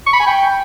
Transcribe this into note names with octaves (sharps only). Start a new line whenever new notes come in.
C#6
B5
G#5
G5